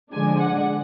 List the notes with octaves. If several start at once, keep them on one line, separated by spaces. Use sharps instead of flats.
D3 F3 G#3 D4 G#5
F#5